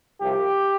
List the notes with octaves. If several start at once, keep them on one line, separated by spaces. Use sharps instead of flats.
C2 C3 F3 G4